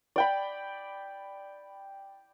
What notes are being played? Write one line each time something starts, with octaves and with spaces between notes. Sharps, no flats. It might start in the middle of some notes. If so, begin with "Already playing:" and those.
D5 G5 B5